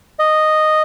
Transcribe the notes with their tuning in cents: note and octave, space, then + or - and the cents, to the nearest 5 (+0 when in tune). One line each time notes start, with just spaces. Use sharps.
D#5 -5